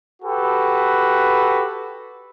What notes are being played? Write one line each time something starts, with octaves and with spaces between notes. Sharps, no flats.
F#4 G4 A4 B4